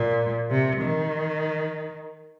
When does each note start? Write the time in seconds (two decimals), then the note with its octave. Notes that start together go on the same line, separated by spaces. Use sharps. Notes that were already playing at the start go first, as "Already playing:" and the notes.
Already playing: A#2
0.50 C3
0.82 D#3